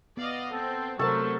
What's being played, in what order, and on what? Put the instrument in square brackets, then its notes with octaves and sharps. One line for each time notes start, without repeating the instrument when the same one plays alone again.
[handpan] B3 [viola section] D5 D#5 F5
[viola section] C4 [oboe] A4
[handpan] C3 A#4 C5 [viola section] F#3 A3 [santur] A4 A5 [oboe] C#6